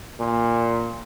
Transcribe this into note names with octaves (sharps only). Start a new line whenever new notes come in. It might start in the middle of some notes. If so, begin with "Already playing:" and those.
A#2